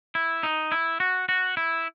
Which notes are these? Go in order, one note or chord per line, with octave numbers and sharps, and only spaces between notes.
E4
D#4
E4
F#4
F#4
E4